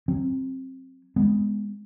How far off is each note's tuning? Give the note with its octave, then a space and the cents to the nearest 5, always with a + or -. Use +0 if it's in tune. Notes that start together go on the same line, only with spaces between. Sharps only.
F#3 +0 C4 +15
G#3 +0 B3 +15